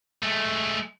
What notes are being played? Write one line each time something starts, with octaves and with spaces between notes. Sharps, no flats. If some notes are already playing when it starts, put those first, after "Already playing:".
G#3 A3